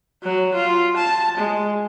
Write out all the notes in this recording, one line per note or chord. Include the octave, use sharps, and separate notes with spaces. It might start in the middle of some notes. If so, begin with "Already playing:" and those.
F#3
F4
A5
G#3